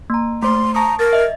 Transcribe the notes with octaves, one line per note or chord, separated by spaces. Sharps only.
A#3 A#5
A3 C5 C6
A5 A#5 C#6 D#6
A#4 A6 A#6
D#5 E5